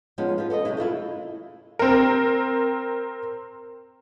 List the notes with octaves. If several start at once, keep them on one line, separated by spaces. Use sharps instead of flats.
F3 G#3 B3 C#4 D#4
F4 G4 B4
A4 B4 D5 D#5
C3 F#3 G#3 E4
E4 F4 A4 C5
C4 A#4